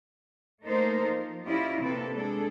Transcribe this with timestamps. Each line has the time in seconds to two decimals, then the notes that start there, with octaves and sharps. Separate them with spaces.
0.64 A3 A#3 D#4 A4 A#4 C5
1.06 F3
1.46 C#4 E4 F4 G4 D5 D#5
1.81 C3 A#3 C4 A4 B4
2.14 G#3 D4 G#4 A4